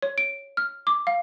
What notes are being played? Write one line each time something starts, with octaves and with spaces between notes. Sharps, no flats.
C#5
D7
F6
D6
F5